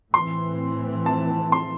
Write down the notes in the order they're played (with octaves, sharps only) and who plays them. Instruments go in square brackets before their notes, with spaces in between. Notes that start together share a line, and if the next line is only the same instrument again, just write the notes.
[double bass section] A2 E3 C4 [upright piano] C6
[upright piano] A5
C6